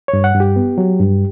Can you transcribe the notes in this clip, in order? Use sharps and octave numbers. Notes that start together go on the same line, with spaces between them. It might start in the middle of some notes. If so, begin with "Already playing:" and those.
C#5
G2
F#5
G2 G4
B3
F#3
G2